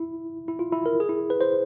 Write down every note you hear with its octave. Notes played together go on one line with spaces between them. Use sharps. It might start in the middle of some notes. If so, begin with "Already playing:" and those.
Already playing: E4
E4
F4
E4
A#4
G#4
E4
B4
C5